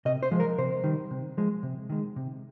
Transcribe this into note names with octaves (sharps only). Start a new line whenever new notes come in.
C3 D#5
C5
F3 G#3
A#4
C3 C5
D#3 G3
C3
F3 G#3
C3
D#3 G#3
C3